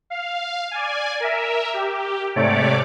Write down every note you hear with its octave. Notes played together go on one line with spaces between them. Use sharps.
F5
D5 G#5
A#4 E5
G4
G#2 C3 A3 C#5 D5 D6